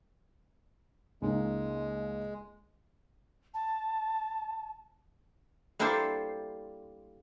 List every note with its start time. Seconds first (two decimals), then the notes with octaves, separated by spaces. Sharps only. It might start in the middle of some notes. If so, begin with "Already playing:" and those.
1.22 C#2 G#3 A#3 D#4
3.54 A5
5.79 G3 A#3 D4 E4 A4 C5